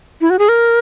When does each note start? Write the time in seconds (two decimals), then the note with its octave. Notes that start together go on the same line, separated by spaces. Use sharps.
0.21 E4
0.30 F#4
0.39 G#4
0.49 A#4